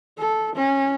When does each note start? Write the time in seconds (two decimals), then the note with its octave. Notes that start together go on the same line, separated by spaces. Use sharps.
0.19 A4
0.56 C#4